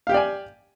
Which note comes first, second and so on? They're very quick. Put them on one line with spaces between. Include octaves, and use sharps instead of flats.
F5 G4 G5 D5 G#5